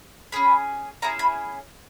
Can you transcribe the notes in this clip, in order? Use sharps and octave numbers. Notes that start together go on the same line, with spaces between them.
C#4 G#4 B5
C#4 E4 G#4 A#5
B5